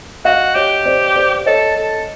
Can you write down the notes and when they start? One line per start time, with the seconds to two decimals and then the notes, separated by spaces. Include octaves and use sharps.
0.25 F#4 D#5 F5
0.55 G4 C#5 D#5
0.86 C5 D5
1.16 C5 D5
1.46 A4 C#5 D#5
1.77 A4